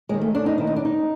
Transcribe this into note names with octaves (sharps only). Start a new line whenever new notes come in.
D#2 D#3 G#3
A3
D4
D#4
D#2 D#3 E4
D#4
D4
D#4